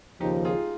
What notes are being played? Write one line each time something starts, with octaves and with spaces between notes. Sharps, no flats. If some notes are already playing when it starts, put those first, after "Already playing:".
D#2 C#3 F3 D#4 G4
F4 G#4